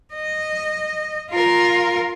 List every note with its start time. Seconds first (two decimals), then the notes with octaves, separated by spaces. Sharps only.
0.14 D#5
1.30 F4 A#4